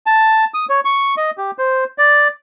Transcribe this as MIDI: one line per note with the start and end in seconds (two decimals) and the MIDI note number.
0.06 0.45 81
0.54 0.65 87
0.69 0.80 73
0.85 1.15 85
1.17 1.31 75
1.38 1.51 67
1.58 1.84 72
1.98 2.28 74